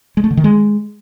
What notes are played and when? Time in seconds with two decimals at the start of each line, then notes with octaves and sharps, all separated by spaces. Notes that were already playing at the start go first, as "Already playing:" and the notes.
0.17 G#3
0.24 A3
0.31 D3
0.37 D#3
0.44 G#3